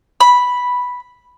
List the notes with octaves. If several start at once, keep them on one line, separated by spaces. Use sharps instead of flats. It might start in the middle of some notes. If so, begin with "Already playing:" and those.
B5